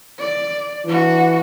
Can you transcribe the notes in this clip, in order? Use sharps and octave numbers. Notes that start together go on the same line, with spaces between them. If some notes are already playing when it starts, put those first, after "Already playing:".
D5
E3 D4 F#4